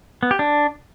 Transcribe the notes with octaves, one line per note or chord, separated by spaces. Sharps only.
B3
G4
D4